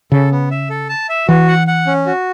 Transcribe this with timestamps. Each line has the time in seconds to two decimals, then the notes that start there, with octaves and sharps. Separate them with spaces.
0.11 C#3 A4
0.31 B3
0.51 E5
0.70 A4
0.89 A5
1.09 E5
1.28 E3 F#4
1.48 F#5
1.67 F#5
1.87 C#4
2.06 F#4